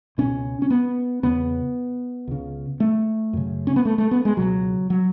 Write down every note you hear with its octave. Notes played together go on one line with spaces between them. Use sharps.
C#2 B2 C#4
C#4
B3
E2 C#3 B3
C#2 C#3
A3
F#2 C#3
C#4
B3
A3
A3
B3
G#3
C#2 B2 F#3
F#3